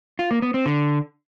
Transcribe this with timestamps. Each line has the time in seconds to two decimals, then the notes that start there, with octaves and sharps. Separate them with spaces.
0.19 F4
0.31 A#3
0.42 B3
0.54 C4
0.66 D3